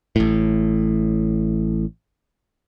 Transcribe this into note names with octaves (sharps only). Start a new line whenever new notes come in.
A1 A2